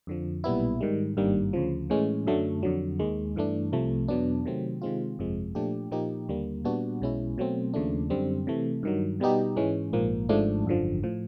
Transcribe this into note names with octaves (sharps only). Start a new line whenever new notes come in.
F2 D3 F3
B1 A#2 G3 B3 E4
G#2 D#3 G3
G#1 G2 D#3 G3 A#3
D2 C#3 F3
A2 E3 G#3 C#4
F#2 D3 F#3 A3
F2 D3 F#3
D#2 D#3 G#3
G2 E3 A3 D4
C2 C3 F3 A3
E2 B2 F#3 B3 D4
C3 D#3 F#3 A3 C4
C3 D#3 G#3 C4 F4
G1 F2 C3 F3 G#3
A#2 F3 A3 D4 G4
A#2 F3 A#3 D#4 G4
D#2 D3 G3 A#3
A#2 G3 B3 D4 F#4
B1 B2 G#3 C#4 E4
B2 F#3 A3 C4
D#2 C#3 F3 A3 D4
F#2 D3 G3 C4
C3 E3 A3
G2 D#3 F#3
B2 G3 B3 D#4 G4
G#2 E3 G#3 C#4
A#1 G#2 F3 A#3
G#1 G#2 F3 A3 D4
G#1 F#2 D3 F3
A2 F3